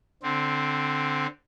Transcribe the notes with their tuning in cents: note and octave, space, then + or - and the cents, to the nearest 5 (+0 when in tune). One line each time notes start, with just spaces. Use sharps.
D3 +0 C4 +0